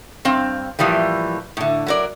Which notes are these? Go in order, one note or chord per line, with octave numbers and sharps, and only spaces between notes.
G2 C4 F5
A2 E3 F3 G3 A#3
A2 D3
F#3 A#4 D5